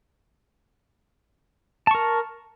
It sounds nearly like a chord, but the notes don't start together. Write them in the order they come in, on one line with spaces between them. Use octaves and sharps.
A5 C#6 A#4